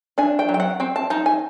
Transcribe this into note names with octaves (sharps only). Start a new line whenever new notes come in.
D4 G#5
G5
F#3
G5
F#5
C4 G5
A5
D#4 A5
G#5